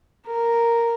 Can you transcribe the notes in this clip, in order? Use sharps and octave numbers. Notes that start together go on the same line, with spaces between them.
A#4